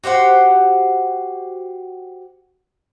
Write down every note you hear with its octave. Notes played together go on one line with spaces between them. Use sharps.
F#4 G4 C5 F#5